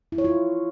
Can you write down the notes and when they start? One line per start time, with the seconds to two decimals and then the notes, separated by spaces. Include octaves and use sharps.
0.12 E4
0.18 C#5
0.24 F4